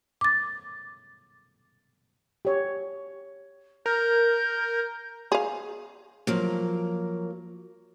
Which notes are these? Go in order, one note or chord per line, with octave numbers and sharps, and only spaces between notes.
D6 A6
G4 C#5
A#4 G6
G#4 F5
F3 F#3 A#3